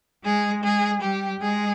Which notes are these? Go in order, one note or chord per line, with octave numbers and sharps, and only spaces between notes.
G#3 G#4
G#3 G#4
G3 G4
G#3 G#4